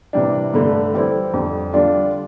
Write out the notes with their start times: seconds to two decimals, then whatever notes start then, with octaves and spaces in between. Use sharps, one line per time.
0.13 C3 E3 G3 D4
0.53 G2 D3 A3
0.94 E3 G3 C4 E4
1.33 F2 D3 G3
1.73 D3 G3 D4 F4